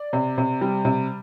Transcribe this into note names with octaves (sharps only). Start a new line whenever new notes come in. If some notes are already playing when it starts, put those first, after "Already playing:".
Already playing: D5
C3
C3
G3
C3